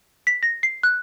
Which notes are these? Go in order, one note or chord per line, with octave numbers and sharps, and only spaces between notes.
B6
A#6
C7
F#6